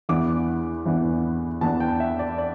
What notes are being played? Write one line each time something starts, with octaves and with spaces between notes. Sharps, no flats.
E2 E3 B3 D4 D6
E2 E3 B3 D4
E2 E3 B3 D4 A5
G5
E5
D5
D5